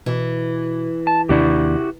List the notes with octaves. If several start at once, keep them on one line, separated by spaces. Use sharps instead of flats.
B2 E3
A5
D#2 C3 D4 E4 F#4 G4